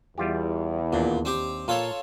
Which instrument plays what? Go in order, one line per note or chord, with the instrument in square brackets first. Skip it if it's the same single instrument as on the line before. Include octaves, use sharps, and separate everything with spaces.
[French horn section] E2 [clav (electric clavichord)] G3 F4 G4
[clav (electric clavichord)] D#2 D4 [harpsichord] A#2
[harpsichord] C4 G4
[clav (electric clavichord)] A#2 [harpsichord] F4 A4 C#5